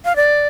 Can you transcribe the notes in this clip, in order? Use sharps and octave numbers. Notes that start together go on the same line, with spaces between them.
F5
D5